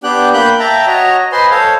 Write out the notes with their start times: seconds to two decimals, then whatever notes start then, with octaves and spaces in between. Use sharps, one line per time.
0.04 B3 D4 G4 G5 F#6
0.33 A#3 G5 B5 F#6 G6
0.59 E5 G5 A5 A#5
0.87 F#4 C#5 D#5 A#5
1.32 B4 C5 D#5 G#5 C6
1.51 A4 C5 C#5 F5